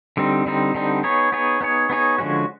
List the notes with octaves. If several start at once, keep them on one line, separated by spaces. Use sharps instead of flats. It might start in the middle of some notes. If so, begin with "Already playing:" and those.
D3 G3 C4 D#4
D3 G3 C4 D#4
D3 G3 C4 D#4
B3 D#4 G#4 C#5
B3 D#4 G#4 C#5
B3 D#4 G#4 C#5
B3 D#4 G#4 C#5
D3 F3 G#3 C#4 F#4